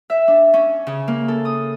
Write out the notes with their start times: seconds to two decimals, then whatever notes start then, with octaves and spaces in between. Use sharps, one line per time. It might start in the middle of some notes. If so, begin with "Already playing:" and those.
0.10 E5
0.28 D4
0.54 C#4
0.87 C#3
1.08 A#3
1.28 A4
1.45 D#6